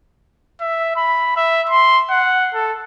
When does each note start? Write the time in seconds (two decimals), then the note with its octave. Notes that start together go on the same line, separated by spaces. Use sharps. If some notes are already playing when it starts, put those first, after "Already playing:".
0.61 E5
0.96 B5
1.36 E5
1.70 C6
2.10 F#5
2.54 A4